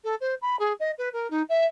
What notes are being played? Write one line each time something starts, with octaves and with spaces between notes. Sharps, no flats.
A4
C5
B5
G#4
D#5
B4
A#4
D#4
E5